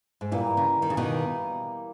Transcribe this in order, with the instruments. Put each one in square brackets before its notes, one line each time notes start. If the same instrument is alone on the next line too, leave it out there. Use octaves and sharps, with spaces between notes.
[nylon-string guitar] G#2
[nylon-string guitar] A#2 [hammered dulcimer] E3 G3 A#3
[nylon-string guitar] C#3
D#3
C#3
B2 D#3